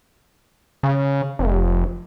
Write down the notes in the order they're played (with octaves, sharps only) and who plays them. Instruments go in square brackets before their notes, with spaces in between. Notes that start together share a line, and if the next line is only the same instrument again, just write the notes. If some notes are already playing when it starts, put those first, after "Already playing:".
[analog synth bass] C#3
F1